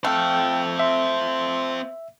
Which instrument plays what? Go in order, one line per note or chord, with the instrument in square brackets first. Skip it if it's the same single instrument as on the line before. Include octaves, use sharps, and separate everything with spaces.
[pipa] A3 [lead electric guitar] C4 F5 [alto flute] G5
[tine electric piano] E5 [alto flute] C6